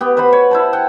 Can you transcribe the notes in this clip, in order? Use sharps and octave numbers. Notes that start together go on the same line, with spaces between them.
B3 G4
B4 C5 F#5 B5
C#5
E4 C5 A5
F#5 G5